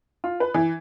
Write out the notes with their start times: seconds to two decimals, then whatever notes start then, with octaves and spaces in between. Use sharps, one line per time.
0.24 F4
0.40 B4
0.54 E3